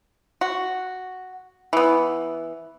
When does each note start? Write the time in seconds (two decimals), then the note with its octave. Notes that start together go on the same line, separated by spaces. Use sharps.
0.41 F#4
1.73 E3 B3